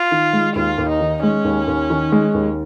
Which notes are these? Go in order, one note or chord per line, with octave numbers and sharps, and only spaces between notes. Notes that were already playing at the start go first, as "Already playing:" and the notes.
Already playing: F4
D#3
G#3
D#2 F4
D#2
D#4
D#3
G#3 C#4
D#2
D#2
D#3
G#3
D#2